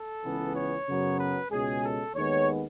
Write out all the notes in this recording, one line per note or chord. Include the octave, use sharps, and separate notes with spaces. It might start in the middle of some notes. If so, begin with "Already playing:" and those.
Already playing: A4
C#2 C#3 E3 B3
C#5
F#2 C#3 F#3 B3
B4
C#2 B2 G#3 C#4 G#4
A4
D#2 D#3 G#3 B3 C#5